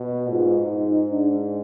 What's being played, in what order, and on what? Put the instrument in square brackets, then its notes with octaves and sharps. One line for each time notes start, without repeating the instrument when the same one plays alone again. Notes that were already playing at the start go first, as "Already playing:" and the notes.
Already playing: [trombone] B2
[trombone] G#2 [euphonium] F4
[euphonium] D#4
D4